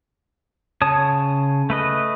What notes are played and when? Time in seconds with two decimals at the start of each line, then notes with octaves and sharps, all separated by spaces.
0.82 C#3 C#5 A5 D#6
1.70 A3 B4 D#5